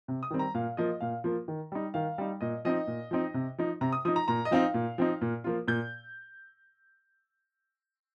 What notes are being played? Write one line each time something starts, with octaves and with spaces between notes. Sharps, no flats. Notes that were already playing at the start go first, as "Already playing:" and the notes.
C3
D#6
D#3 G3 C4
A#5
A#2 F5
F3 A#3 F4 D#5
A#2 F5
F3 A#3 F4
D#3
G3 D#4
D#3 F5
G3 D#4
A#2 D#5
F3 C4 D#4 D#5
A#2
F3 C4 D#4
C3
F3 D#4
C3 A#5
D#6
F3 D#4 D#6
A#5
A#2 A#5
D#5
F3 C4 D#4 F5
A#2
F3 C4 D#4
A#2
F3 A#3 F4
A#2 G6